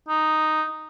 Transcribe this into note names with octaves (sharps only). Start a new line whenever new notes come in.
D#4